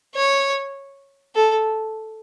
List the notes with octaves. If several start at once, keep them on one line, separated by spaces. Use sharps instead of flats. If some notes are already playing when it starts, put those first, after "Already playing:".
C#5
A4